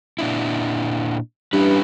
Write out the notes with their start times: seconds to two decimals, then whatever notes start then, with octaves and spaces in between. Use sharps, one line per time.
0.19 A#2 D4 E4
1.53 G2 C#4 E4 B4